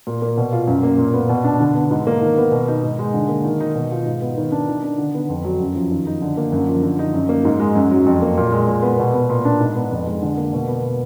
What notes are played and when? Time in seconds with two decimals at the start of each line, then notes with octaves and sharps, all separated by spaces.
0.07 A#2
0.22 A#3
0.37 B2
0.52 F4
0.67 F#2
0.83 A#3
0.98 A#2
1.14 B3
1.29 B2
1.44 D4
1.60 D3
1.75 B3
1.91 G#2
2.07 A#3
2.22 D#3
2.38 B3
2.52 B2
2.68 D#4
2.83 G#2
2.99 G#3
3.14 D3
3.29 A#3
3.44 D#3
3.61 D#4
3.75 B2
3.91 F4
4.06 G#2
4.22 B3
4.38 D#3
4.52 D4
4.68 D#3
4.83 D4
4.98 D3
5.15 B3
5.29 F2
5.45 F#3
5.60 F#2
5.76 F3
5.91 D#3
6.07 D#4
6.22 D3
6.37 A#3
6.52 F#2
6.68 F3
6.83 D3
6.99 D#4
7.14 F#2
7.29 A#3
7.45 G#2
7.60 G#3
7.75 F#2
7.91 F#3
8.06 F2
8.22 A#3
8.38 A#2
8.52 G#3
8.68 A#2
8.83 B3
8.99 B2
9.14 B3
9.30 A#2
9.45 D4
9.60 G#2
9.75 B3
9.91 F2
10.07 G#3
10.22 D3
10.38 A#3
10.53 B2
10.68 B3